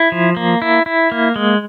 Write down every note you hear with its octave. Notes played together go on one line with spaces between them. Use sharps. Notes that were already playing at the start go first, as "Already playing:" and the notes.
Already playing: E4
F3
A#3
E4
E4
A#3
G#3